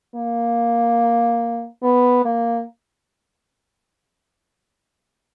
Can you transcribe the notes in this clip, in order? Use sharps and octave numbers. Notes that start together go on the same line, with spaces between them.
A#3
B3
A#3